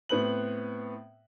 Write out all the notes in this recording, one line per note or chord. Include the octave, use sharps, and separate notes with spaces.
A2 B3 C4 B4 F#7